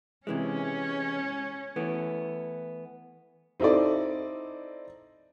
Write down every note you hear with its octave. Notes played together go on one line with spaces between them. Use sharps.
C3 E3 G#3 C#4
E3 A3 B3
C4 D#4 E4 A4 D5